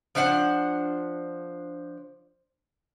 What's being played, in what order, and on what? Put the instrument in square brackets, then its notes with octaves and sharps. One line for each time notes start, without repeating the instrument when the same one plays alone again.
[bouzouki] F3 D4 C5 F#5